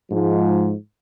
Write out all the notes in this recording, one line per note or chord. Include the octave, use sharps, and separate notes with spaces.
G#2 F3